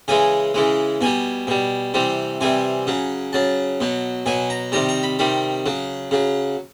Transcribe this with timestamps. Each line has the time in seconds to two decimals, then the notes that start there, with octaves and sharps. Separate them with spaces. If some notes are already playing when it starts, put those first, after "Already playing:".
0.08 C#3 E3 G#3 G#5
0.54 C#3 E3 G#3
1.01 B2 G3 G#5
1.47 B2 G3
1.94 C3 E3 G3
2.41 C3 E3 G3 G#5
2.87 C#3 F#3
3.33 C#3 F#3 A5
3.80 B2 F#3
4.26 B2 F#3 G#5
4.50 A#5
4.72 C3 D#3 G3 A#5
4.89 A#5
5.03 B5
5.19 C3 D#3 G3 B5
5.66 C#3 F#3
6.11 C#3 F#3